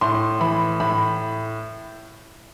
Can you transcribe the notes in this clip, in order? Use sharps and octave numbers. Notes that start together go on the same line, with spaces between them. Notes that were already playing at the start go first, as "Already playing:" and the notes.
A2 C6
E3 B5
A2 B5